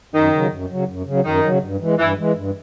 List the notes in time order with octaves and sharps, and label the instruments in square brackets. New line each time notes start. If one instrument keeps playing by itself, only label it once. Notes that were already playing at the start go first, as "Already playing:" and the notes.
[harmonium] F#2 [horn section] D#3 D#4
[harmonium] C#3 F#3
F#2
C#3 F#3
F#2
C#3 F#3
[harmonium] F#2 [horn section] D#3 D#4
[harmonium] C#3 F#3
G2
E3 G#3
[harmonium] G2 [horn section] E3 E4
[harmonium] E3 G#3
G2